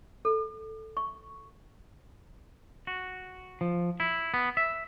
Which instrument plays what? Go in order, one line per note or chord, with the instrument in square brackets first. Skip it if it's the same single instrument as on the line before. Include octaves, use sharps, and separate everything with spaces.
[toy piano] A4
C#6
[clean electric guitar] F#4
F3
E4
B3
E5